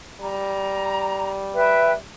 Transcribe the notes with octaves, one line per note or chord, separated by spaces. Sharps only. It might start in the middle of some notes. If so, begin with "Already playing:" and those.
G3 A#5
B4 E5 G5